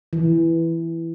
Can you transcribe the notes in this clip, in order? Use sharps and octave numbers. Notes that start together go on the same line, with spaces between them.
E3